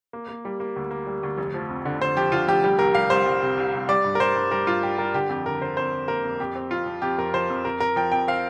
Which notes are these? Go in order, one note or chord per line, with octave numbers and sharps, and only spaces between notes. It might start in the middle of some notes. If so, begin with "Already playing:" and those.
A#3
A#3
G3
A#3
D2
A#3
G3
D2
F1
F3
F2
D3
D3 C5
F3 G4
D3 F4
F1 G4
G3 G4
C2 A#4
G3 F5
C2 C5
C2
C3
C2
C2
G3 D5
G2
A#4
G3 C5
G2
G3 A#4
G2 F4
G3 G4
G3 A#4
D3 G4
F2 G4
D3 A#4
D3 C5
F2 C5
F2
A#3 A#4
F2
F2 G4
C4
F2 F4
F3
F2 G4
F2 A#4
F3 C5
F2
F2 A#4
F2 A#4
F3 G5
F2 G5
C4 F5